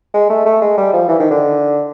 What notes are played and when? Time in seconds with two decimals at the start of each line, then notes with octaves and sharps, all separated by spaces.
0.14 G#3
0.30 A3
0.46 A3
0.61 G#3
0.77 G3
0.94 F3
1.09 E3
1.20 D#3
1.31 D3